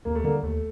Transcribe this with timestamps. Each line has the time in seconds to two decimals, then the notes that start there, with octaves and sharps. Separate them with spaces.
0.05 D#2 A#3
0.15 A3
0.24 D3 G3 A#3
0.43 D#2 A3